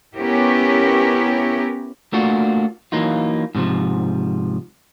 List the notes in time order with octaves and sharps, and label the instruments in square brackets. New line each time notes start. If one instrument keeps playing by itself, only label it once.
[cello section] B3 C#4 E4 G4 A#4
[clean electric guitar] A3 A#3 D4 F4 F#4
E3 F#3 A#3 D#4 F4
G#2 C3 E3 F3